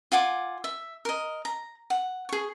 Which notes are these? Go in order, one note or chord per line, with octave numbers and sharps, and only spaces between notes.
F4 F#5 G#5 D6
E5
A#4 D#5
A#5
F#5
G#4 C#6